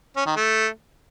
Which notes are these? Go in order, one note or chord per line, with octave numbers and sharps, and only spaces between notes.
C#4
D#3
A3